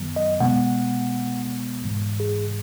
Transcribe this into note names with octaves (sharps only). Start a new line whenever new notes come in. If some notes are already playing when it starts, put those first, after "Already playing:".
Already playing: F#2 D#3 F#3 B3
D#5
B2 G#3 B3 F#5
G#2 E3 G#3
G#4